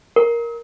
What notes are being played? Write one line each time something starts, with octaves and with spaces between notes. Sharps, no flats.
A#4